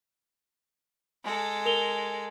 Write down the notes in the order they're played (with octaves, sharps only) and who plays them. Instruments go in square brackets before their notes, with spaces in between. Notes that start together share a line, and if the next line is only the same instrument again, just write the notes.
[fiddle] G#3 A4
[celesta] A#4 F7 G7